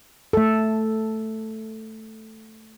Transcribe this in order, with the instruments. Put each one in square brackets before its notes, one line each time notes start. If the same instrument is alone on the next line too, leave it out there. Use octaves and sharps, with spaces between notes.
[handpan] A3 A4